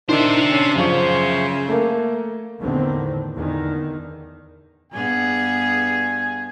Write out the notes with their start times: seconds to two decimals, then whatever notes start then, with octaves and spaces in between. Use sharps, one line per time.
0.09 D#3 D4 C5 E5
0.52 C#4
0.76 F#2 C#3 F3 C#6
1.69 A3 A#3
2.60 E2 A2 D3 D#3 C4
3.36 E2 D3 D#3
4.92 G2 B3 G#4 G#5